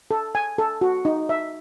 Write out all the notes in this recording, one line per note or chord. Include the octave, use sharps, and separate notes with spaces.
A4
G#5
A4
F#4
D#4
E5